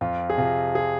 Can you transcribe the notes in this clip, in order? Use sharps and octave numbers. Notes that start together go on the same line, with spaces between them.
F2 F4
G#4
C3 F3 F4
G#4